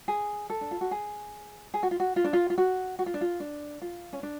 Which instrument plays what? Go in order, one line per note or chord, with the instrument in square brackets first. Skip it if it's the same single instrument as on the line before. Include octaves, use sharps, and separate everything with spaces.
[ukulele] G#4
A4
D4
F4
F#4
G#4
G#4
F#4
F4
F#4
F4
D4
F4
F4
F#4
F#4
F4
D4
F4
D4
F4
C#4
D4